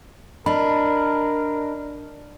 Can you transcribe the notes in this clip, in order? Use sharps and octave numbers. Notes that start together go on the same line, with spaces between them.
D4 A#4 D#5 B5